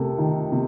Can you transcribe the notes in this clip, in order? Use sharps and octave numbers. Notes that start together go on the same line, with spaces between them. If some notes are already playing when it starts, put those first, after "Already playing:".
Already playing: C3 A3 A4 A#4
D#3
C3